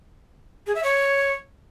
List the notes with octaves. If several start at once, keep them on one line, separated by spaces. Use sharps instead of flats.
G#4
E5
C#5